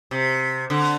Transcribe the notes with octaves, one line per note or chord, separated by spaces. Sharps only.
C3
D3